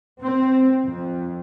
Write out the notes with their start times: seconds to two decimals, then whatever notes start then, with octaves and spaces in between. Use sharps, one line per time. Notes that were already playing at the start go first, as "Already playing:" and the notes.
0.21 C4
0.85 F2